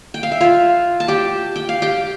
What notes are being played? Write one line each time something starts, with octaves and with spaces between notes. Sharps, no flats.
G5
F5
E5
F4 F5
A5
G4 G5
G5
F5
G4 G5